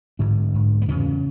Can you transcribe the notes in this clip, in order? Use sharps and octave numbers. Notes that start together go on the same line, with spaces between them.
G#2 D3 D4
G#2
B3
E2 C#3 C#4